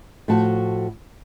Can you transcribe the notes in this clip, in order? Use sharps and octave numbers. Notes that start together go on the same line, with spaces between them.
A2 F3 F#4 A5